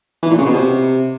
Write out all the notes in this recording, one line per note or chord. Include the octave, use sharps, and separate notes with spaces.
E3
A#2
C#3
B2
C3